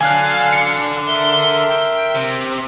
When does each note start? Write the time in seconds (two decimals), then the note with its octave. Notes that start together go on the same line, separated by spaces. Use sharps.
0.01 D3 F#3 D4 F5 G#5 F6 F#6
0.53 C#7
1.07 A#4 E5 C6 G7
1.68 G5
2.16 C3